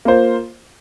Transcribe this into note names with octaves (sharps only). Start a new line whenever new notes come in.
A#3 F4 C5